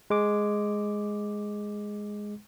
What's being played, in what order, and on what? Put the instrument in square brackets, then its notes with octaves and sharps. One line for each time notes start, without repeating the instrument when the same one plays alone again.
[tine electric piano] G#3 D6